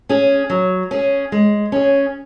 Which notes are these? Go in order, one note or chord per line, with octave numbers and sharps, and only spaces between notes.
C#4 G#4
F#3
C#4 G#4
G#3
C#4 G#4